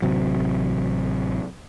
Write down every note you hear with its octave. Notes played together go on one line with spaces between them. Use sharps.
A1 C3 F#3